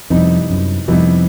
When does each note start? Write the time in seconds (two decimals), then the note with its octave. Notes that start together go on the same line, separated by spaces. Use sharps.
0.10 F2 C3 E3 G3 B3 D#4
0.50 F#2
0.88 F2 C3 E3 G3 B3 D#4